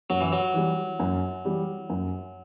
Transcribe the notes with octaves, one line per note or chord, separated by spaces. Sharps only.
F#2 F#3
E3
F#3
E3 G3
F#2
E3 G3
F#2